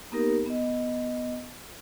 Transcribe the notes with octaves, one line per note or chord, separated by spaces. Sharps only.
A#3 B3 D#4 G4 A#4
B3 D#5